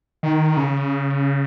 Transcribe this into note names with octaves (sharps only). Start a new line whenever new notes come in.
D#3
C#3